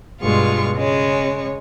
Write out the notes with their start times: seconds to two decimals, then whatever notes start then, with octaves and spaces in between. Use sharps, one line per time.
0.22 G2 B2 G#3 F4 C#6
0.76 C#3 G#3 C#5